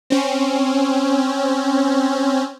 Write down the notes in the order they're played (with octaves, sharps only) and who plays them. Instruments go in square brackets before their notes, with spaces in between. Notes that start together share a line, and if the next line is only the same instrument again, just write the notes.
[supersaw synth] C4 C#4